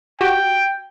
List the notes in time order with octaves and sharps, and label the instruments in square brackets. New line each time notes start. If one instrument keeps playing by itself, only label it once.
[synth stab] F#4 G4 [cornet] G5